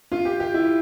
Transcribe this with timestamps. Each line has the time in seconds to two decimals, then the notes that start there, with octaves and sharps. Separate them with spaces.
0.12 F4
0.25 G4
0.40 G4
0.54 E4